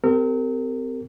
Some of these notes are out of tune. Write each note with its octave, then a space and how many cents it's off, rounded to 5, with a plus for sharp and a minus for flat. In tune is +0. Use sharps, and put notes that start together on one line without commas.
C4 -30 G4 +0 A#4 -35